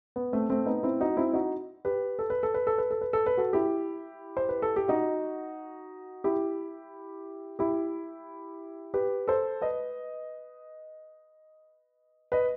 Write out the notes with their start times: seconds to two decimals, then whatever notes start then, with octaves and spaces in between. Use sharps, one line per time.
0.16 B3
0.33 A3 C4
0.50 A3 C4
0.66 B3 D#4
0.83 C4 E4
1.00 D#4 F#4
1.17 C4 E4
1.33 D#4 F#4
1.85 G4 B4
2.19 A4
2.30 B4
2.43 A4
2.54 B4
2.67 A4
2.78 B4
2.91 A4
3.01 B4
3.13 A4
3.26 B4
3.37 F#4 A4
3.53 E4 G4
4.37 C5
4.49 B4
4.62 A4
4.76 G4
4.88 D#4 F#4
6.24 E4 G4
7.59 E4 G4
8.94 G4 B4
9.28 A4 C5
9.61 B4 D#5
12.32 B4 D#5